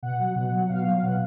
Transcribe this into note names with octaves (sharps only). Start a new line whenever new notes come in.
B2 F#5
F#3
B2
F#3
B2 F5
F#3
B2 F#5